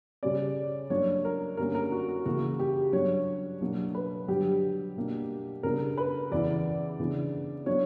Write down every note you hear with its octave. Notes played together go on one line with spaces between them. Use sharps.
C#3 G3 C#4 D5
G2 F#3 A#3 D4 C#5
A#4
G2 D3 G3 A#3 C#4 A#4
A#4
F#4
F#4
C#3 E3 A#3 F#4
G4
G2 F#3 B3 D4 C#5
B2 F#3 A#3 D4
B4
G2 D3 F#3 G4
B2 A#3 D4
C#3 G3 B3 D4 A#4
B4
E2 C#3 E3 D5
C#3 E3 B3 D4
F#3 B3 D4 C#5